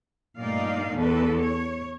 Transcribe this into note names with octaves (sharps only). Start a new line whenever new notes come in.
G2 A#2 A3 D#4 D5 F5
E2 A4 B4
C#5